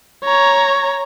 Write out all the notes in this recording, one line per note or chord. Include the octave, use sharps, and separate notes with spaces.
C#5 A#5